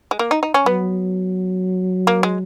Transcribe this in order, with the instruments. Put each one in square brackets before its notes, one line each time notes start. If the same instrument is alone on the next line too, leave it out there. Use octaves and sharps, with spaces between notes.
[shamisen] G#3
A#3
D#4
D#4
C#4
[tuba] F#3 [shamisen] B3
[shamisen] A#3
G#3